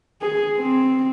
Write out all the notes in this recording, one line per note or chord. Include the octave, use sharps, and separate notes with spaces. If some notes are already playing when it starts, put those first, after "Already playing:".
G#4
C4